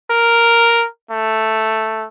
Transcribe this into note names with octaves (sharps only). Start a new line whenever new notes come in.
A#4
A3